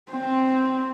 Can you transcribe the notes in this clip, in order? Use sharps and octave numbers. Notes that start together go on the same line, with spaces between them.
C4